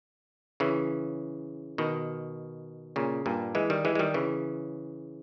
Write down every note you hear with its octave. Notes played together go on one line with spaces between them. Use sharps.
C#3 E3
B2 D#3
A#2 C#3
G2 A#2
E3 G#3
D#3 G3
E3 G#3
G#3
D#3 G3
C#3 E3